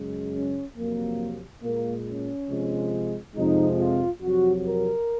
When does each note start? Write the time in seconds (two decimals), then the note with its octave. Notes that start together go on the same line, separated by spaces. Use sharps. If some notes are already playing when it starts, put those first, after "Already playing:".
Already playing: F#2 C#3 G#3
0.33 C#4
0.77 F2 C3 F#3 A#3
1.63 A#2 G#3 A#3
2.06 C#4
2.50 C3 F3 G#3
3.36 F2 C3 F3 G#3 D#4
3.78 F4
4.21 F2 C3 F#3 F#4
4.65 A#4